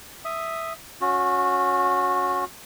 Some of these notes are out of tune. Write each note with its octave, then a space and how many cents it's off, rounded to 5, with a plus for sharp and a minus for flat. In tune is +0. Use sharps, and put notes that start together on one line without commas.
E5 +0 D#6 +0
C#4 +0 F#4 -25